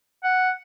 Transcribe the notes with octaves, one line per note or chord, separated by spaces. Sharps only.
F#5